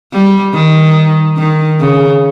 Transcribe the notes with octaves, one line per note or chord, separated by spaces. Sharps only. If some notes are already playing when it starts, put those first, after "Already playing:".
G3
D#3
D#3
C#3